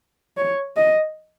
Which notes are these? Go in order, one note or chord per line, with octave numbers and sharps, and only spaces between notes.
C#5
D#5